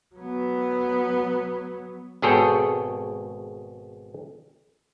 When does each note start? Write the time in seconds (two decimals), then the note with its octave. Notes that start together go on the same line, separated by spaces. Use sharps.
0.15 F#3 B3
2.22 G#1 B2 G#4 A4 C#5 G5